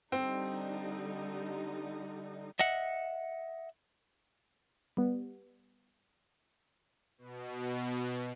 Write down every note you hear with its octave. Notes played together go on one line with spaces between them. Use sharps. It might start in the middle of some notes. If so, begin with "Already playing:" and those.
D3 G3 C4 D#4
D#5 E5 F#5
G3 B3
B2